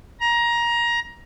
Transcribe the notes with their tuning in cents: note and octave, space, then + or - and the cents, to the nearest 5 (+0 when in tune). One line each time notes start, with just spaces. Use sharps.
A#5 +20